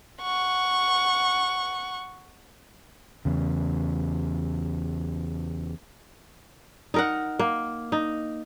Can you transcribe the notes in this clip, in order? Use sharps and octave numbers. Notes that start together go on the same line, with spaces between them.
F#5 C#6
E2 C#3
D#4 A#4 F#5
A#3
D#4